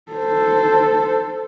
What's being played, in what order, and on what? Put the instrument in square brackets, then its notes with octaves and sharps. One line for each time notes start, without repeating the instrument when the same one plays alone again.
[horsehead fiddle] A4 C5